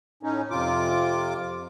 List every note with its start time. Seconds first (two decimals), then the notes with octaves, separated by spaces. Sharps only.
0.23 A2 C#4 D#4
0.50 F2 C3 F4 D6